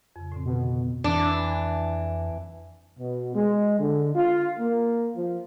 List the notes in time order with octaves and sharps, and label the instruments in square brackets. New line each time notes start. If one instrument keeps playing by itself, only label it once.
[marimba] F2 C#3
A2 D3 C4
[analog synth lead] B2
[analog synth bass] F2 [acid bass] E3 [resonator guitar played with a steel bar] D4
[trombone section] B2
G#3
D3
F4
A#3
F3